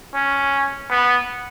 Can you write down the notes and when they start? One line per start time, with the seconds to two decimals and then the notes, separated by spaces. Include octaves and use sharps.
0.14 C#4
0.90 B3